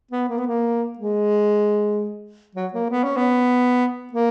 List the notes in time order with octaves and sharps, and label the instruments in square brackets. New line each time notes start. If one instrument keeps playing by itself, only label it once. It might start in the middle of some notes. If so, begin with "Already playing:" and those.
[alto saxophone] B3
A#3
B3
A#3
G#3
F#3
A#3
B3
C#4
B3
A#3